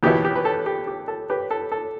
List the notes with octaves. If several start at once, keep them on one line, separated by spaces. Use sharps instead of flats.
E2 B2 B3 E4 G4
G4
B4
A4
G4
G4
A4
G4 B4
A4
A4